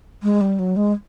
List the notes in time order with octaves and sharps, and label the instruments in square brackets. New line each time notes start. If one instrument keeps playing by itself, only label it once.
[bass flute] G#3
G3
F#3
G#3